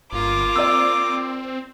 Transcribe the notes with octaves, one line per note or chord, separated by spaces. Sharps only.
G1 A#3 F4 D6
C4 D5 E6